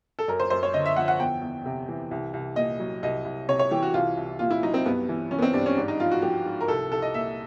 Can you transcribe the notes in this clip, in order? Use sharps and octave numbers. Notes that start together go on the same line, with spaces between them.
A4
F#2 A#4
C5
F#2 C5
C#5
D3 D#5
E5
F3 F#5
F#5
E2 G5
E2
C3
E3
C2
C2
A#2 D#5
F#3
C2 D#5
C2
C3 C#5
C#5
E3 G4
F#4
C2 F4
C2
A#2 F4
E4
F#3 D#4
C4
G2 B3
E3
E3 C#4
B3
C4
G2 D4
C#4
G#2 D4
D#4
F3 F4
F#4
F3 G4
G#2
A#4
C2 A4
C2 A4
D#5
A#2 E5